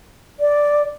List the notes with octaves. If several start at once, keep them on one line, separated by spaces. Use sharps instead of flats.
D5